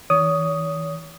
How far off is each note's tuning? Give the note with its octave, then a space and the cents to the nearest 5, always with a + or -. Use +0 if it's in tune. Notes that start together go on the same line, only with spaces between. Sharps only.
E3 -40 C#5 +40 D#6 +0